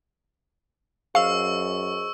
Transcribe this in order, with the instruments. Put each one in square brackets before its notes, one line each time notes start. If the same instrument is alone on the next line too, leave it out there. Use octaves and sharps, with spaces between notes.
[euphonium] F#2 [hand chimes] G#4 C5 D#5 [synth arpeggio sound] F5 [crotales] C#6 E6